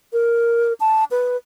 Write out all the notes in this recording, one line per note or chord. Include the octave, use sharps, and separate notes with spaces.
A#4
A5
B4